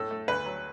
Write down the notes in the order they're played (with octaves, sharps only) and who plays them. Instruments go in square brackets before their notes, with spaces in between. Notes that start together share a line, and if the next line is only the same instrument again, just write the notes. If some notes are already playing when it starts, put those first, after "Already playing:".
Already playing: [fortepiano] A2 A4
A3
D2 B4
F#3